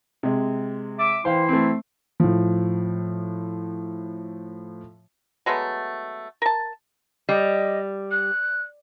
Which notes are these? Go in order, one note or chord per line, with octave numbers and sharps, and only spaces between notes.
C3 G#3
E5 D6
E3 E4 C5 F5 G5 C6
A3 C4
A2 F3
F#3 G#3 A3 B3
A#4 A5
G3 D#5
F#6